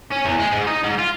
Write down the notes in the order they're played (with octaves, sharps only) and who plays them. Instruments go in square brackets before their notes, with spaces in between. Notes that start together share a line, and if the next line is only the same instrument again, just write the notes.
[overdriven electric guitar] C#4
E2
G#3
G#2
D#4
G#2
F4